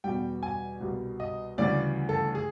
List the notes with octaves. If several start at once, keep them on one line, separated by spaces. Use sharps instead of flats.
E2 B2 G3 G5
G#5
C2 B2 G3
D#5
D2 C#3 E3 G3 D5
A4
G#4